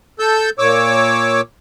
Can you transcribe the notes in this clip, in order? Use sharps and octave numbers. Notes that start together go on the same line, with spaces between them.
A4 E6 G6
A#2 C#5 D6 E6